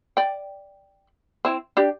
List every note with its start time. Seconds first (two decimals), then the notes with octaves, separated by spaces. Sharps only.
0.17 D5 G5
1.45 C4 E4
1.77 D4 G4